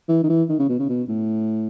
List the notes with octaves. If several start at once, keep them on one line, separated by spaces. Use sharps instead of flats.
E3
D#3
E3
D#3
C#3
B2
C#3
B2
A2